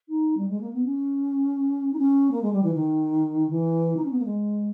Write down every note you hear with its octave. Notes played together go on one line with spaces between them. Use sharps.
D#4
G3
G#3
A#3
B3
C#4
D#4
C#4
A#3
G#3
G3
E3
D#3
E3
D#4
C#4
B3
A#3
G#3